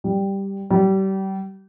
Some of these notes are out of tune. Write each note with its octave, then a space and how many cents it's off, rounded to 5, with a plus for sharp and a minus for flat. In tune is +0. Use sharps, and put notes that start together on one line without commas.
G3 +0
G3 -30